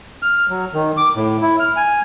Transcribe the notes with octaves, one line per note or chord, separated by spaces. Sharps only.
F6
F#3
D#3
D6
A2
E4
F6
G#5